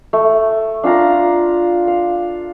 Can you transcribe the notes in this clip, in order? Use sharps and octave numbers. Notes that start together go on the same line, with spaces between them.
A3
D4 F4 F5 A#5
F5